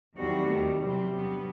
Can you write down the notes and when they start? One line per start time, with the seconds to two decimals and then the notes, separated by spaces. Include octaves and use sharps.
0.17 E2 D#3 F#3 G3 C4 F#4
0.48 D#2 D#3 A3
0.81 E2 C3 F#3 G3 C4
1.13 G2 F#3 B3